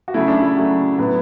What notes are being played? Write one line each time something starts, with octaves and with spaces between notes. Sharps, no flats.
F#4
C#3 F#3 A3 E4
D4
E4
C#3 F#3 A3
A2 F#3 B3